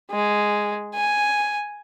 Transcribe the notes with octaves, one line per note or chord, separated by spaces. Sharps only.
G#3
G#5